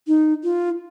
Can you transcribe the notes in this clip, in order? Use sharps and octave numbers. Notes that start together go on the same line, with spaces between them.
D#4
F4